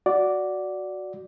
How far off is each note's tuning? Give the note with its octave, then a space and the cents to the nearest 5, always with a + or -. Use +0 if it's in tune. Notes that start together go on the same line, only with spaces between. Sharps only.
F#4 +0 D5 -10